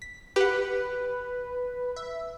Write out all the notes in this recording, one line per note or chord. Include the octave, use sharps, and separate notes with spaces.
B6
G4 B4 F#5
E5